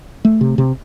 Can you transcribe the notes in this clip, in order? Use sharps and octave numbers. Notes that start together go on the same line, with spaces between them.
A3
C3
C3